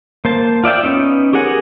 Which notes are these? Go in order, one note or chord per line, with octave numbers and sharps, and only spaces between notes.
A#3 C5 A5
F4 D5 E5 G5
B3 C#4 D#4
G4 G#4 A#4 F#5 G#5